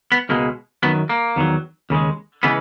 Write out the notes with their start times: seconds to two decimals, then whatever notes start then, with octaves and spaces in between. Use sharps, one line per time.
0.12 B3
0.29 C#2 B2 G#3 A#3
0.83 F#2 D#3 F#3 B3
1.09 A#3
1.36 E2 D#3 F#3
1.90 D#2 C#3 G#3
2.43 C#3 E3 G#3 B3